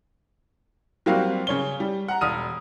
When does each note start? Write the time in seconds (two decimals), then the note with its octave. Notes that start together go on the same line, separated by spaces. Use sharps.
1.06 F#3 G3 A#3 C4 F#4 F5
1.47 C#3 C#5 G7
1.80 G3
2.08 F#5 A#5
2.21 E1 D#6 F6 D#7